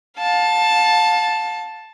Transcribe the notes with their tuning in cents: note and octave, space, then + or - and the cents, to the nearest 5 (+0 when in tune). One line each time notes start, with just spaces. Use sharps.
F5 +35 A5 +0